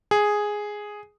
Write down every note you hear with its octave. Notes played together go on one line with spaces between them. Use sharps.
G#4